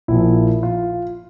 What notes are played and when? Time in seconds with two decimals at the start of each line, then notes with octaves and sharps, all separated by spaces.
0.08 A#1 A#2 F3 E4
0.63 F4